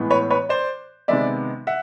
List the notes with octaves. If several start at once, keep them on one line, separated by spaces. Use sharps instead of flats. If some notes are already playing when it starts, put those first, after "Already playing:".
Already playing: A2 E3 G#3 B3
B4 C#5
B4 C#5
C5 D5
C3 D#3 G#3 B3 D5 E5
E5 F#5